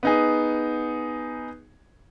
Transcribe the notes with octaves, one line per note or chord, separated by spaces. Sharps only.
B3 D#4 G#4